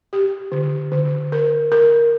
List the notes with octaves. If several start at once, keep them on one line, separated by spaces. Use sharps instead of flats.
G4
D3
D3
A#4
A#4